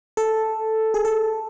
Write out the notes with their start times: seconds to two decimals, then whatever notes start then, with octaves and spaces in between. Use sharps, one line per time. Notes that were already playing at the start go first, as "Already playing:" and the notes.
0.17 A4
0.94 G#4
1.05 A4